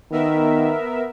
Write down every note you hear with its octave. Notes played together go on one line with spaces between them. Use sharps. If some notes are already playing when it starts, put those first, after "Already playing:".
D#3 B3 A#4 E5